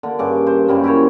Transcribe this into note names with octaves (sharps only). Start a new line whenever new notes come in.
D3 A#3
G2 C#3 D6
C5
F#2 C#3 G3 A#3
E4 A#4 C5 C#5